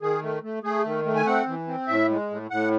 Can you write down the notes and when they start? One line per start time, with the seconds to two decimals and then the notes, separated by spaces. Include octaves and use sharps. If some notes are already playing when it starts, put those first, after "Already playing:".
0.01 D#3 G#4
0.23 A3
0.43 A3
0.63 A3 G#4
0.85 D#3
1.05 A3
1.16 G#5
1.26 C4 F#5
1.47 E3
1.67 C4
1.88 A2 E5
2.10 G#3
2.30 A2
2.50 A2 F#5